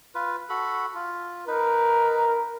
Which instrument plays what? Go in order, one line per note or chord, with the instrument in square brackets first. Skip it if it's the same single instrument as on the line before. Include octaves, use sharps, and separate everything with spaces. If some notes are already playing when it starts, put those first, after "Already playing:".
[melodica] F4 B4
F#4 A4 B5
F4
[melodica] D#4 B4 [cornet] A#4